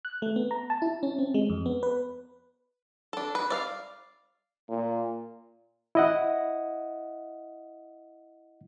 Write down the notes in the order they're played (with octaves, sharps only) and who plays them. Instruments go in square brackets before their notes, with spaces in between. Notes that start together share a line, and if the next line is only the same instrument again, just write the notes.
[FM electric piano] F#6
A3
B3
A#5
A5
E4
C#4
C4
G#3
F2
B3
B4
[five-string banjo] D4 A4
B4
D5 E5 F5
[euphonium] A#2
[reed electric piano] E4 D#5 F#5